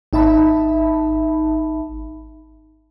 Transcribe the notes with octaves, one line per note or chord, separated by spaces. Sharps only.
G#1 D#4 E5 A5 B5